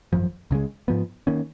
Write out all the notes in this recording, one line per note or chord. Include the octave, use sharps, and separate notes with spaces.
G#1 F#2 F3
C#2 C#3 G#3
G#2 F3 B3
D#3 A#3 C#4